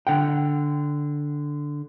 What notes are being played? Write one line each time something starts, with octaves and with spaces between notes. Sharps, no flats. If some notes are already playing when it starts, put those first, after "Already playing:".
D3 F#5 G5